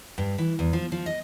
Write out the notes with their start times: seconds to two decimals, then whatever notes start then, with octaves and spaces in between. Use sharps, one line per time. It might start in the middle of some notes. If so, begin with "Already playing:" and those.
0.18 G2
0.38 E3
0.59 E2
0.73 F3
0.92 F3
1.06 D#5